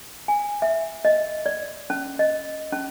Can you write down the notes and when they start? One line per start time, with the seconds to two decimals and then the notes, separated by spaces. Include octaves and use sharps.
0.28 G#5
0.62 E5
1.05 D#5
1.46 D5
1.90 C#4
2.19 D#5
2.73 C#4